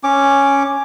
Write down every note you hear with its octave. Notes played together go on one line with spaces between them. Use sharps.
C#4 D6